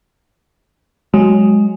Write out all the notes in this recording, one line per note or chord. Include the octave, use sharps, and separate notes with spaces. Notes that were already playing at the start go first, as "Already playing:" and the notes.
F#3 G#3